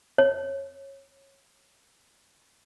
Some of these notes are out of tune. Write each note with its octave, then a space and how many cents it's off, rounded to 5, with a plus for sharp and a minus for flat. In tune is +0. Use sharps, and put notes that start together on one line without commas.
C#5 -25